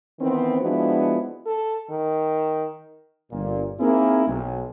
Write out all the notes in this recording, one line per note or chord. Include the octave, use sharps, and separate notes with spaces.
D#3 E3 B3 C4
F3 G#3 B3 D4 E4 F#4
A4
D#3
G1 A#2
A#3 C4 D#4 E4 G#4 A#4
B1